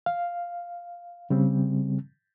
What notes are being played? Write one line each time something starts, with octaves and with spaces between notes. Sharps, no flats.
F5
C#3 G3 C4